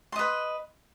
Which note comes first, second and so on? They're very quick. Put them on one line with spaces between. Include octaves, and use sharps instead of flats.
C6 D#5 B4